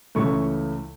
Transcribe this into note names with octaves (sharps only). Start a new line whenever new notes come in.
C#2 C#3 E3 A3 C#6